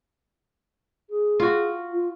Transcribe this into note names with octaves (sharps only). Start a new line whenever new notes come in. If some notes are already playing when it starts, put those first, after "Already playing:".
G#4
F4 F#4
F4